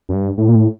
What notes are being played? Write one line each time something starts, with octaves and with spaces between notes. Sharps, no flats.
F#2
G2
A2
A#2
A2